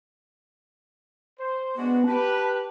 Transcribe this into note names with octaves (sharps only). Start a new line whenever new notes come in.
C5
G#3 B3 D4 F#4
G4 B4 A5